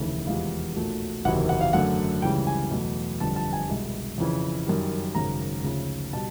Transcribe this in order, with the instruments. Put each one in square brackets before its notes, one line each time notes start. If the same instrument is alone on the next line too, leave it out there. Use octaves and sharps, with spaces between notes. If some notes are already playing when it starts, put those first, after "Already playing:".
Already playing: [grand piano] F1 D#2 C#3 E3 A3
E2 C3 F3 G#3 F5
B1 A#2 F#3 A3
F#1 E2 C3 D#3 F#3 F#5
F#5
F5
F#2 D3 F#3 A3 F#5
C#2 C#3 E3 G3 G5
G#5
E2 B2 F#3 A3
G1 F2 D3 G3 A5
A5
G#5
C2 B2 G#3
F2 C#3 E3
F#2 D#3 G3
G#1 F#2 C#3 A#5
D2 C#3 F3
B2 G3 A5